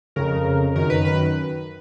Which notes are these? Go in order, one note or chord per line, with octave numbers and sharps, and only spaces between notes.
F2 C#3 A#4
F#2 D#3 A#4
B4
B4